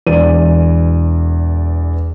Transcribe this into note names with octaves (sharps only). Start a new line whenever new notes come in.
E1 E2 D5 D#7